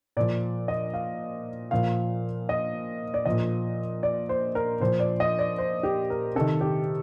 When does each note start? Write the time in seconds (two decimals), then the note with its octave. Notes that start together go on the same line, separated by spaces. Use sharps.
0.17 A#2 F3 D5
0.68 D#5
0.94 F5
1.71 A#2 F3 F5
2.49 D#5
3.14 D5
3.25 A#2 F3 D#5
4.03 D5
4.29 C5
4.55 A#4
4.80 A#2 F3 C5
5.00 D5
5.20 D#5
5.39 D5
5.58 C5
5.83 G4
6.10 A#4
6.35 C3 D#3 A4
6.61 G4